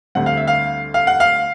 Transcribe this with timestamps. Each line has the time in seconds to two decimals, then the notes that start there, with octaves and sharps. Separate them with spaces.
0.15 D2 D3 G3 C4 F#5
0.26 F5
0.37 E5
0.48 F5
0.94 F5
1.07 F#5
1.20 F5